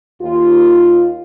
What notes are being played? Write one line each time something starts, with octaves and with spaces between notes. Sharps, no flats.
D#2 F4